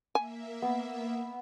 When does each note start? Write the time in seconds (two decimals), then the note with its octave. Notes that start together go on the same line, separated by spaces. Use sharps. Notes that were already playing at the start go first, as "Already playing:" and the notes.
0.15 A#3 E5 G#5
0.62 B3